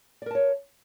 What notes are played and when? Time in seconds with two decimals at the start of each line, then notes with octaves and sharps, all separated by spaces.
0.22 D5
0.26 A#4
0.31 A5
0.35 C#5